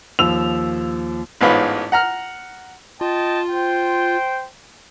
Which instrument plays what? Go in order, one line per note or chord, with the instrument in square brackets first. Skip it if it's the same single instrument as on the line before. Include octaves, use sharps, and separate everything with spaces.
[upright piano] D#2 F3 E6 F7
[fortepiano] A1 G#2 B3 F4 C#5 B5
F#5 A#5 F6
[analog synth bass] F4 [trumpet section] D#5 G5 A5
[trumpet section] C5 G5